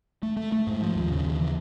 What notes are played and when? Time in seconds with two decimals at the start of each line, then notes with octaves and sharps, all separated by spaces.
0.23 A3
0.37 A3
0.52 A3
0.67 G#2
0.82 F3
0.95 D#2
1.11 C#3
1.25 D#2
1.40 E3